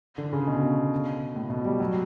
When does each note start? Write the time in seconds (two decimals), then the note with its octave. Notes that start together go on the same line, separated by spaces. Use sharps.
0.18 D3
0.33 C#3
0.47 B2
1.36 A2
1.50 B2
1.65 G3
1.80 F#3